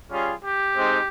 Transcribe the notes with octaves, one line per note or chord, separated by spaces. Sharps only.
G3 C#4 F4 G#4
G4
G#3 C4 D#4